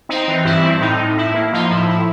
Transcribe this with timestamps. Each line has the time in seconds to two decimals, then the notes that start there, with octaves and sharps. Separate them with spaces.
0.09 C4 D#4
0.28 E3
0.45 G2 E4
0.64 C4
0.81 A2 D#4
1.00 A2
1.17 A2 E4
1.34 A#3
1.53 F3 D#4 F4
1.70 A2 E4
1.88 F3 E4